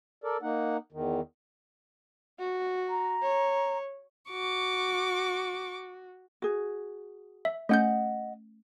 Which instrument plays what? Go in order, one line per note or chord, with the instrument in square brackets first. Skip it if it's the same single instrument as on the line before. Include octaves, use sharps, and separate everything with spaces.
[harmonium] A4 A#4 D5
A#3 D#4 F#5
E2 D#3
[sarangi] F#4
[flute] A#5
[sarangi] C#5
[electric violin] F#4 [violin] C#6 D6
[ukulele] F#4 G#4
[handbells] E5
[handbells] A3 C#4 G6 [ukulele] D#5 F#5